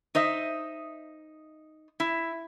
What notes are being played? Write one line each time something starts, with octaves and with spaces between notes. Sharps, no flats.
D#4 C5 D#5 E5
E4